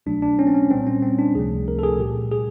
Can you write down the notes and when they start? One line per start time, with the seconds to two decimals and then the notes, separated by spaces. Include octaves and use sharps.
0.06 C2 B2 F#3 A3 D4
0.22 D4
0.39 C#4
0.47 C4
0.54 C#4
0.71 A#2 G3 C4
0.87 C#4
1.03 C4
1.19 D4
1.35 C#2 C3 F3 A3 G#4
1.68 A#4
1.79 A4
1.83 G#4
1.99 A#2 G3 G4
2.31 G#4